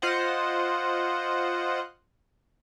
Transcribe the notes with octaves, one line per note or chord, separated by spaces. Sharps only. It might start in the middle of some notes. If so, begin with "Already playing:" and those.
F4 C5 D#5 F#5